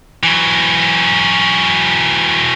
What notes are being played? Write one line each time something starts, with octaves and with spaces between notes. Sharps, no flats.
E3 F#3